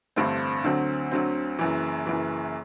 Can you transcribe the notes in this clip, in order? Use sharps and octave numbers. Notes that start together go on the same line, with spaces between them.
A1 G2 D3 A3 C4
D2 D3 F#3 C4
D2 D3 F#3 C4
F#1 F#2 E3
F#1 F#2 E3